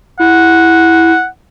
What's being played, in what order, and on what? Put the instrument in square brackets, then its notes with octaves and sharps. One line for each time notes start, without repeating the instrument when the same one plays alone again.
[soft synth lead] E4 [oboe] F#5